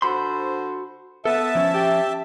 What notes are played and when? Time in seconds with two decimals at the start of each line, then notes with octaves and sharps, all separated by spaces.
0.02 D3 F#4 C5 B5 C6
1.25 B3 A4 E5 A5
1.55 F3 C#4
1.74 G4